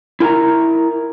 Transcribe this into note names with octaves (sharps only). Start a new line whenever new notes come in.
E4 A#4 G#5 A#5